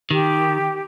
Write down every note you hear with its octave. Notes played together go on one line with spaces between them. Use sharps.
D#3 G4